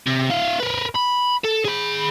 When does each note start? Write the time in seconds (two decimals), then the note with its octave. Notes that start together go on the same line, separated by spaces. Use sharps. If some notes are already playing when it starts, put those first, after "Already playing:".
0.06 C3
0.30 E4 F5
0.60 A#4 B4
0.95 B5
1.44 A4
1.65 G#4 B5